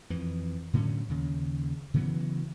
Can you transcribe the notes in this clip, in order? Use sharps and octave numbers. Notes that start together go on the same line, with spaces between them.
F2 E3
A2 D3 F#3 C#4
D#2 C#3
C#3 E3 F#3 B3